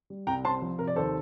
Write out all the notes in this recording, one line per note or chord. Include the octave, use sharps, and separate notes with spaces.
G3
C2 G5 A#5
C4 A5 C6
F3
C3 A#4
D5
D#2 A4 C5